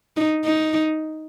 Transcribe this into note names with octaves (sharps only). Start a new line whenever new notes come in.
D#4
D#4